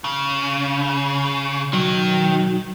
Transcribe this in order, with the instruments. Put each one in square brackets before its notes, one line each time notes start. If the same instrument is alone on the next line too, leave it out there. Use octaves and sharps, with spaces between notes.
[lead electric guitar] C#3
[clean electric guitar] B1 F#3 [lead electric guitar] D#3